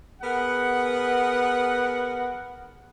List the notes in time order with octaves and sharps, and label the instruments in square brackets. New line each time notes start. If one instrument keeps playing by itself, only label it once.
[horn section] B3 G#4 A#4 F#5